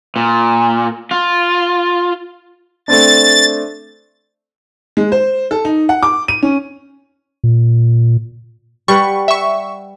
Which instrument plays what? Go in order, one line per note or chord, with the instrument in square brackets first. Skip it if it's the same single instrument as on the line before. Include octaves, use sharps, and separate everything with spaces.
[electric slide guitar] A#2
F4
[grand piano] A3 C4 D4 [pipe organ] A6
[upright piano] G#3
C5
A4
D#4
F#5
D6
D#7
C#4
[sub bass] A#2
[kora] G3 B4 F#5 [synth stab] C#6
[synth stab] E5 C#6